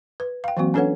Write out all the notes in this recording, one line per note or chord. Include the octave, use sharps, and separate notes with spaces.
B4
F5 G5
E3 F#3 A#3 C4 F#4
C#4 D4 A4 B4 C#5 F#5